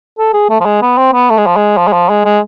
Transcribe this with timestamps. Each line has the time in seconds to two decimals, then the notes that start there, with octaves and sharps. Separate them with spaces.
0.19 A4
0.34 G#4
0.50 A3
0.61 F3
0.66 G#3
0.82 B3
0.98 C4
1.13 B3
1.30 A3
1.38 G#3
1.47 F3
1.57 G#3
1.78 F3
1.88 G#3
1.93 F3
2.10 G#3
2.25 G#3